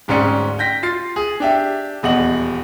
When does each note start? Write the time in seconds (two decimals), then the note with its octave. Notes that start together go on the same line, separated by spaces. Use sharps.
0.08 D1 G#2 C4 C#4 D5 C#7
0.59 G5 G6 A#6 B6
0.83 F4 A6 C7
1.16 G#4
1.40 D4 G4 E5
2.03 D#1 E2 D#5 F#5 F#7